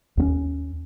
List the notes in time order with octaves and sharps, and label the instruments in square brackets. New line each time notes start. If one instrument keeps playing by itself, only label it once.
[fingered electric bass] D#2 B3 C#4